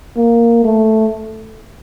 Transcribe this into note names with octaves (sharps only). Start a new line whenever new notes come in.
A#3
A3